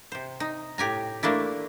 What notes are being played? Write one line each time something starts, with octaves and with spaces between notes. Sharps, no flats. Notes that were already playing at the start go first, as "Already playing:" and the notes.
C3 C5
D#4
A2 G4 G#5 A#5
A3 A#3 D4 E4